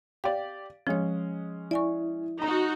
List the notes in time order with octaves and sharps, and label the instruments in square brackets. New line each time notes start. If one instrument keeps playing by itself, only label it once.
[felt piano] G4 D5 [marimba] F5
[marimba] F3 C#5 [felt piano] G#3 C#4
[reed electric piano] E4 [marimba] D5 G#5 C#6
[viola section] D#4 F#4 [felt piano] A#5